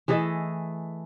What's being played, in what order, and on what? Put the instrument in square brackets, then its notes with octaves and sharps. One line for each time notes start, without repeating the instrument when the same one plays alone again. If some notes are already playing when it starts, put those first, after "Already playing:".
[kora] E3 A3 G#4 D#5